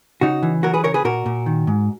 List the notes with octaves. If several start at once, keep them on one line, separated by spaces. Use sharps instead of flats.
C#3 D#4 F#4
E3
F#3 F#4 A#4
G#4 B4
C#3 A#4 C#5
G#4 B4
A#2 F#4 A#4
A#2
D#3
G#2